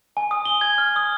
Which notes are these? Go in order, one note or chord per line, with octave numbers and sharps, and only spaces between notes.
G#5
D#6
G7
G#6
F6
D#6